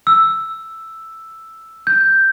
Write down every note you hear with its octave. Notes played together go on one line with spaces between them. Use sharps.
E6
G6